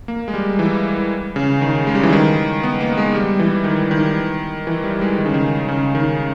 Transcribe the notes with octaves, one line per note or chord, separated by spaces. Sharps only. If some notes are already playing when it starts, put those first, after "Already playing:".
A#3
G#3
G3
E3
C#3
D#3
G#3
G3
E3
D#3
B3
A#3
G#3
G3
E3
D#3
D#3
E3
G3
G#3
D#3
C#3
D#3
C#3
D#3